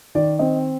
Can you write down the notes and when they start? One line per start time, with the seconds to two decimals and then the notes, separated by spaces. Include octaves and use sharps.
0.15 D#3 D5
0.39 C4 D#5